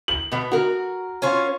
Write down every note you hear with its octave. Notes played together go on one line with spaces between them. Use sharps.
F#7
B2 B3
F#4 A#4
C#4 F4 C#5